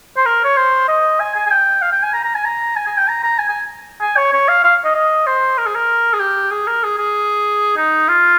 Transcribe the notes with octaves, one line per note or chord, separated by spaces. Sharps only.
C5
A#4
C#5
C5
D#5
G#5
G#5
G#5
G5
F5
G5
G#5
A#5
A#5
G#5
A#5
G#5
G#5
G5
A#5
A#5
G#5
G#5
G#5
C#5
C#5
F5
F5
D#5
D#5
C5
A#4
G#4
A#4
G#4
G4
G#4
A#4
G#4
G#4
D#4
F4